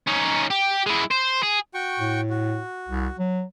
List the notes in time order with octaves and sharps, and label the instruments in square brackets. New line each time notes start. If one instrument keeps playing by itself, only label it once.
[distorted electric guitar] C#4 D#4
G4
G#3 E4
C5
G#4
[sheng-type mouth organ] F#4 G5 C#6
[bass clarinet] A2
[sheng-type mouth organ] F#4
[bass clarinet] C2
F#3